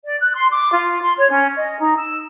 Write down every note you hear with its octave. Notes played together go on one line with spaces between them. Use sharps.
D5
F#6
C6
D6
F4
C6
C#5
C#4
D#5
D#4
E6